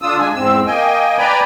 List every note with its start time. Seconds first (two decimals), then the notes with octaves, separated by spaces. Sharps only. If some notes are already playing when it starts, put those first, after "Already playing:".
0.02 D3 D4 F4 D#6 E6
0.19 G#3 D4 G#5
0.34 E2 G#2 C4 E6
0.66 A#3 D#5 G5 G#5
1.19 B4 D5 G5 G#5 A#5 B5